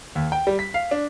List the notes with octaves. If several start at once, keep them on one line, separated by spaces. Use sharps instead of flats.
D#2
G5
G3
B6
F5
D4